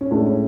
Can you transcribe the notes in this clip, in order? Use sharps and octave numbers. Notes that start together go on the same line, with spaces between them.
C#4
A2 G#3 D4
C#4